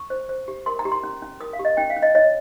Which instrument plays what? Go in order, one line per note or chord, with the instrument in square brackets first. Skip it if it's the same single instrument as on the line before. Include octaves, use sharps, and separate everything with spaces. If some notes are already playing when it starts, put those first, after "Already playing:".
Already playing: [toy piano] C#6
C5
C5
G4
A#4 C6
A#5
G4
C6
C#4
C#4
A#4 D#6
F5
G4
D#5
C#4 G5
F5
C#4
D#5
C#5 D#5